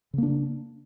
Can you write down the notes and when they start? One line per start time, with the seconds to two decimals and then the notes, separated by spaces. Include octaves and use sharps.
0.13 C#3
0.18 A#3
0.23 D4